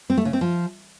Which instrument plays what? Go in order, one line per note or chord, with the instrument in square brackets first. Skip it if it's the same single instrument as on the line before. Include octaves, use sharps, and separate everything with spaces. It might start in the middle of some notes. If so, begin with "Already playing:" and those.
[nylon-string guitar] C4
A3
C#3
C4
F3